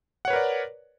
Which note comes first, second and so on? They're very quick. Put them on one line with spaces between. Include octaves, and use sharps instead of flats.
F#5 C#5 B4 A#4 D5